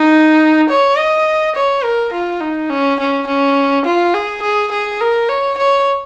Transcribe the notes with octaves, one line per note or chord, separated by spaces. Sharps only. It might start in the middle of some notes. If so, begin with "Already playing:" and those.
Already playing: D#4
C#5
D#5
C#5
A#4
F4
D#4
C#4
C#4
C#4
F4
G#4
G#4
G#4
A#4
C#5
C#5